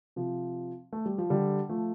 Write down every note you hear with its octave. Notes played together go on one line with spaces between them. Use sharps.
C3 F3
A3
G3
F3
D3 G3
F3 A3